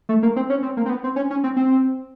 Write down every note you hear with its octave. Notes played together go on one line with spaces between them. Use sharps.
A3
A#3
C4
C#4
C4
A#3
C4
B3
C4
C#4
C#4
C4
C4